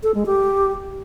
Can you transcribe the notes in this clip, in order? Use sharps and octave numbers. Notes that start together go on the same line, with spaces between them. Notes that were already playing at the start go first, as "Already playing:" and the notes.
A4
G#3
G4